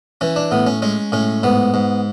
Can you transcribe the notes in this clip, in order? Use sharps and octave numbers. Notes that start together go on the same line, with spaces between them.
E3 C#4
D4
A2 B3
C#4
G#3 C#4
A2 C#4
G#2 B3
G#2